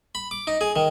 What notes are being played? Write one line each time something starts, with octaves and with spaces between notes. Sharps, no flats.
B5
D6
D#4
G#4
D#3